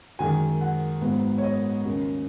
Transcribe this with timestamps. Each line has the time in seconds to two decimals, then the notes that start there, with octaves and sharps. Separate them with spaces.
0.19 F#2 D#3 G#3 G#5
0.61 F#5
1.01 G#2 F#3 B3
1.38 C#5
1.43 D#5
1.85 D#2 C#3 F#3 C#4